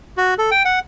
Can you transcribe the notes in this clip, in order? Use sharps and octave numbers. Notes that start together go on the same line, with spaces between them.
F#4
A4
G5
F#5